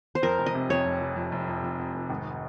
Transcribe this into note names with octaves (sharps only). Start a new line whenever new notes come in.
C5
F2 A#4
F1
D#5
C3
F2 C#5
F1
F1
F2
F1
F2
F2
F2
F1
G#1